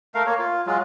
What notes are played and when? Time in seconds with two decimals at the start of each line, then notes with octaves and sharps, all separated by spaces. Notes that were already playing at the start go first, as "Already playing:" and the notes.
0.15 A3 A#4 F5
0.27 A#3 C#5
0.39 F4
0.67 F#3 G#3 F4